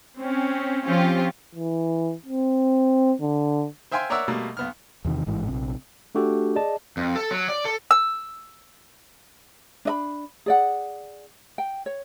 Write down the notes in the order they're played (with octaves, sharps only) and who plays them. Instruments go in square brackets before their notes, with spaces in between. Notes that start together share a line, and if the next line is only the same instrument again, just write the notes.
[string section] C4 C#4
F3 C4 C#4 F4 G4
[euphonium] E3
C4
D3
[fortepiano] C5 E5 F5 G5 G#5 C6
A#4 C#5 D5 E5 F#5 E6
B2 G3 A3 A#3
B1 B3 F6
[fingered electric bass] E2 C3 D#3
A1 G#2 E3
A#1 C3
[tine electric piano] A3 D4 F#4 G4 A4
G#4 D5 D#5 A5
[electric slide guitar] F2
A4
F#3
D5
A4
[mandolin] E6
[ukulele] D4 D#5 B5
G#4 D5 F#5
G5
C#5